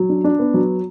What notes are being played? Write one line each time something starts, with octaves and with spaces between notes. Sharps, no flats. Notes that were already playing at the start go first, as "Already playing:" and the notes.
Already playing: F#3
D4
D4
B3
F#3